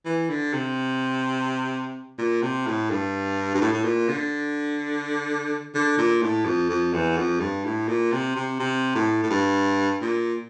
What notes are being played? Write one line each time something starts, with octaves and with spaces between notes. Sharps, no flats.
E3
D3
C3
A#2
C3
A2
G2
G2
A2
A2
A#2
D3
D3
A#2
A2
F2
F2
E2
F2
G2
A2
A#2
C3
C3
C3
A2
A2
G2
A#2